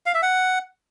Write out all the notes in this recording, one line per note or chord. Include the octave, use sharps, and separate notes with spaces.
F5
E5
F#5